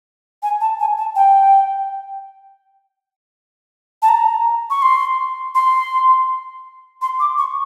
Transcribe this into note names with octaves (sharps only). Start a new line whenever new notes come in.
G#5
A5
G#5
A5
G5
A5
A#5
C#6
C6
C6
C6
D6
C#6